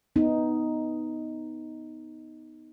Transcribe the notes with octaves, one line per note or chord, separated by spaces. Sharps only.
B3 D#4